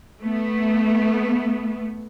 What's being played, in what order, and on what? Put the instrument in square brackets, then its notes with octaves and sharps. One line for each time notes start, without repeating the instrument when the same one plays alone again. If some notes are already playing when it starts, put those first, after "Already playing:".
[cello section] A3 B3